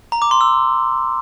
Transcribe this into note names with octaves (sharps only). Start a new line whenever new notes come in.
A#5
D6
C6
E6